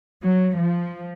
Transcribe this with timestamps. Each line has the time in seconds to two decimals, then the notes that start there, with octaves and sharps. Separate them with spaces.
0.23 F#3
0.57 F3